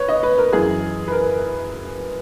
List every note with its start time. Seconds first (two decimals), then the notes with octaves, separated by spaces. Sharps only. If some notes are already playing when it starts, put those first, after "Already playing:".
Already playing: B4 C#5
0.08 D#5
0.23 B4
0.38 A#4
0.53 F#2 E3 G#4
1.08 B4
1.12 A#4